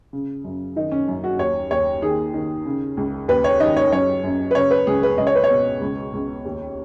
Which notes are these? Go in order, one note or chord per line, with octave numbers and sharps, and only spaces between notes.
C#3
F#2
D#3 D#4
C#4
F#2
F#4
D#2 C#5
D#2 C#5
D#3 G#4
D#3
C#3
C#2
D#2 B4
C#5
D#3 D#5
C#5
F#2 C#5
F#2
B4
C#3 C#5
B4
C#2 G#4
B4
C#2 D#5
C#5
B4
C#5
B2
C#2
C#2
D#2